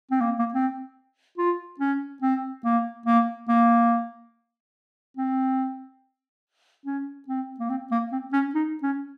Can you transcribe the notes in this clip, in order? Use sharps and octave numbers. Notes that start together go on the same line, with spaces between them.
C4
A#3
A#3
C4
F4
C#4
C4
A#3
A#3
A#3
C4
C#4
C4
A#3
C4
A#3
C4
C#4
D#4
C#4